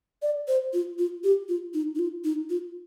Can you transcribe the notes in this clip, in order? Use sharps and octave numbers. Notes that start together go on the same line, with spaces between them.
D5
C5
F4
F4
G4
F4
D#4
D#4
F4
D#4
F4